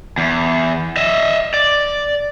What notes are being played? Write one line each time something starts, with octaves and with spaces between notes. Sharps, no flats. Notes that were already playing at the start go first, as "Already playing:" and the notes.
E2
D#5 E5
D5